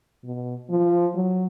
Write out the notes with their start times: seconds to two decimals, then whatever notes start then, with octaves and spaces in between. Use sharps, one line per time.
0.24 B2
0.70 F3
1.14 F#3